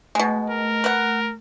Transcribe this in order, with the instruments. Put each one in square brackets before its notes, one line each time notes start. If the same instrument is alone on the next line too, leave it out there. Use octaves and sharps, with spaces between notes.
[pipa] B2 G#3 [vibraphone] A3
[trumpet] A#4
[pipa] B4 F#5